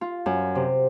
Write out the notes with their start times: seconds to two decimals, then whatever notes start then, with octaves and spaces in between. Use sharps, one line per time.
0.01 F4
0.26 F#2
0.55 C3